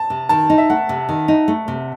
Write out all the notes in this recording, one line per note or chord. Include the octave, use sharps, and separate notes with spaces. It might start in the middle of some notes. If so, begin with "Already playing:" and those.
Already playing: A5
C3
D#3 A5
D#4
E5
A3 F#5
C3
D#3
D#4
A3
C3